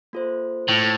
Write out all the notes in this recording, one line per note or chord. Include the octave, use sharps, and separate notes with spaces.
A#3 F4 A4 C5
A2